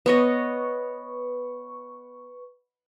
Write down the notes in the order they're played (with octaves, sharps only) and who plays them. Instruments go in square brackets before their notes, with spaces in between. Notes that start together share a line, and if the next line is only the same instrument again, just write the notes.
[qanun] B3 C#5 D#5 [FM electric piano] B4 C#6